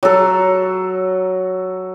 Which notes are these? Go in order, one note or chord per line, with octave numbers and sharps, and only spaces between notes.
F#3 A4